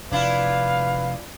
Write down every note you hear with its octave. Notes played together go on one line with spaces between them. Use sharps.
F1 D4 E4 F4 B4 F5